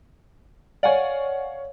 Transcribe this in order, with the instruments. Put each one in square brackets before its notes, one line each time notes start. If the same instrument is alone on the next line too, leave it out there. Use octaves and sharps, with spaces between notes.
[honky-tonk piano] C#5 F5 [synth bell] D5 F#5 G#5